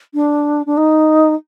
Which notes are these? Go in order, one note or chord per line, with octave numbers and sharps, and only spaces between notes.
D4
D4
D#4